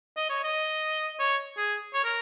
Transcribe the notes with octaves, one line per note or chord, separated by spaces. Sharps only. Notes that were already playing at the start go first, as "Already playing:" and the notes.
D#5
C#5
D#5
C#5
G#4
C#5
A#4